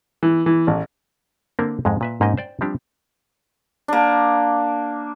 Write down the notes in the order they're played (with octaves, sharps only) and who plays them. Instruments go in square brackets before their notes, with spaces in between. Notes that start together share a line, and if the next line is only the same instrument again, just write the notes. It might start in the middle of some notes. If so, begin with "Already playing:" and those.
[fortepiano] E3
E3
A1
[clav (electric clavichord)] D3 A#3 C4 D4 A#4
F2 G#2 G#3
A#2 B4 E5
G#2 A#3 C#4 D#4 G4 D#5
C5 D5 G5
F3 G3 C4 D4 G4
[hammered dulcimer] A#3 D4